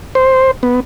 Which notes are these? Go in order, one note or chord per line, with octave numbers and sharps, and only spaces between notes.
C5
B3